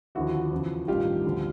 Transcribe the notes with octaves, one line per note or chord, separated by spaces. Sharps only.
D#2 D3 F3 E4 F#4
E2 C#3 F3
A1 G2 D#3 F4 G4
D2 D3 F3